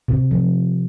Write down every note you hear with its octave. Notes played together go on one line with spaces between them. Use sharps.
C3
F3